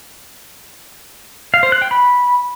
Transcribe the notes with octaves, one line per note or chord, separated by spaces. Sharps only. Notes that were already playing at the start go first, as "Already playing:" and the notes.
F5
C5
F#6
G5
B5